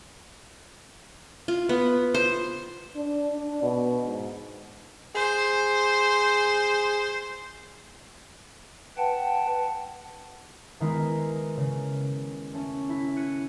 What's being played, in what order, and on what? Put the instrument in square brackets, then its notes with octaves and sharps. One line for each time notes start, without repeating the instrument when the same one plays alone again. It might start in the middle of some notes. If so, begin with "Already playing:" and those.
[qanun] F4
B3
C5
[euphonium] D4
D4
B2
G#2
[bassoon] G#4 [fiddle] C5
[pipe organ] B4 F#5 G5 A5
[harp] D#3 G#3 B3 E4 A#4
C#3
A3 C#4
E4
F#6 G#6 C#7 D#7